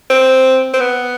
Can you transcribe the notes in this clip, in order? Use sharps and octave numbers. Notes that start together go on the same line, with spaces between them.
C4
C4
B3